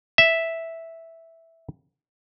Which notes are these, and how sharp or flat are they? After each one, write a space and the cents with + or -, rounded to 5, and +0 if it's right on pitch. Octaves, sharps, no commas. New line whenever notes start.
E5 -5